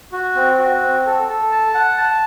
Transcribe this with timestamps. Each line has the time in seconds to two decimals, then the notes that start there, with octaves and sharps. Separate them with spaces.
0.12 F#4
0.35 C4
0.59 F#4
0.82 C4
1.06 A4
1.28 A4
1.52 A5
1.74 F#5
1.97 A5